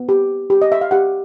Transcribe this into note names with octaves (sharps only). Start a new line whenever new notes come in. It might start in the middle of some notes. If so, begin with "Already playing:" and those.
Already playing: B3
G4
G4
D#5
E5
F5
G4 F#5